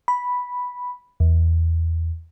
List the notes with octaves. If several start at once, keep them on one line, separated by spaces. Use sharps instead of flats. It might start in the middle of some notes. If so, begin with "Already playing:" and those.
B5
E2